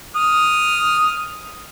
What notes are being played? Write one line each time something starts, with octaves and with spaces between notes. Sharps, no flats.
D#6 F6